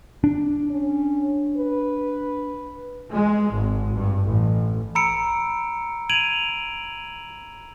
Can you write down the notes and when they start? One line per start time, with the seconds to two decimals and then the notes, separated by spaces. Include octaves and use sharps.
0.24 D4
0.71 C#4
1.57 B4
3.12 G#3
3.53 G#1
3.95 G2
4.26 A1
4.95 A#5 B5 E6 C#7 D7
6.09 G#6 D7 D#7 F7 F#7